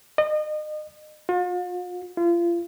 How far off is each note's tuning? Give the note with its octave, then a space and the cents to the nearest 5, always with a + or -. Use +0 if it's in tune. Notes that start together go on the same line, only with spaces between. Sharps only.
D#5 -35
F4 +45
F4 -30